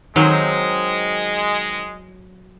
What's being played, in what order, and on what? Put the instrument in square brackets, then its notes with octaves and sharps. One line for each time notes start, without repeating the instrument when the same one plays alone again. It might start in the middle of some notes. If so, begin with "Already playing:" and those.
[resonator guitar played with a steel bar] D#3 C4 [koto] F#3 [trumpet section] G#3